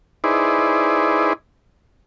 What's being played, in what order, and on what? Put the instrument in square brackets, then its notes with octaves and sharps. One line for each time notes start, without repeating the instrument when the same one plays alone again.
[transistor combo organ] D#4 E4 G#4 B4 C5 D5